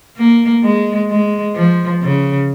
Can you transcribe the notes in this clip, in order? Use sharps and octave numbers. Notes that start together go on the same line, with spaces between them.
A#3
G#3
G#3
F3
C#3